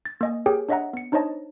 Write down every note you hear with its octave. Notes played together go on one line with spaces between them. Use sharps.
A6
A#3 D#5 G#5
G4 G#4 A#4 C#5 G5 G#5
D4 C#5 D#5 E5 F#5 A#5
B3 C#7
D4 D#4 C5 C#5 D#5 A5